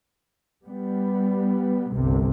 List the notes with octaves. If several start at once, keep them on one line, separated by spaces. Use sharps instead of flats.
G3 B3
G1 C2 C3